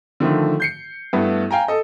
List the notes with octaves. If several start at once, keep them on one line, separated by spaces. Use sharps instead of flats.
D3 D#3 F3 A3
G6 C7 C#7
G2 A3 B3 E4
F5 G5 G#5 A#5
A4 D#5